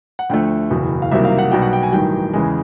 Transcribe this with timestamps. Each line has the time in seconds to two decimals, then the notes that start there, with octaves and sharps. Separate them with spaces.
0.19 F#5
0.29 D2 D3 F3 A3 G5
0.70 F#1 E2 B2
1.02 F5
1.11 C2 C3 D#3 F#3 A#3 E5
1.25 F5
1.39 F#5
1.52 B1 B2 G3 A#3 G5
1.62 F#5
1.73 G5
1.83 G#5
1.92 A1 G2 D#3 F#3 G5
2.33 E2 C#3 E3 G#3